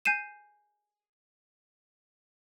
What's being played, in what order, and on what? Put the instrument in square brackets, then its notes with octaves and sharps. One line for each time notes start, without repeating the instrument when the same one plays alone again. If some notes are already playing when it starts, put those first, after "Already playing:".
[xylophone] G#5 G6 C7 D#7 E7